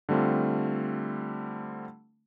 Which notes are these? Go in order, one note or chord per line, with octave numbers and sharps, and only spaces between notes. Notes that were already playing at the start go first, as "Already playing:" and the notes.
D3 G3 A3 C4 F4